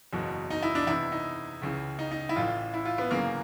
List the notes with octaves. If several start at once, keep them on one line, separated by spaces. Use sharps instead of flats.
F#1 E2 B2 F#3
D#4
E4
D4
E2 C3 E3 E4
D#4
C#2 C#3 E3
D#4
D#4
E4
A1 A2 E3 F4
E4
F4
B3
G1 F#2 C#3 E3 A#3